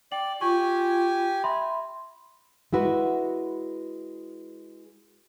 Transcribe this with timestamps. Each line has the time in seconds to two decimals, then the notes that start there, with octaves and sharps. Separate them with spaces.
0.12 D5 G5 F#7
0.41 F4 G4 G#5 C#6
1.44 E5 B5 C6
2.73 G#3 E4 F#4 B4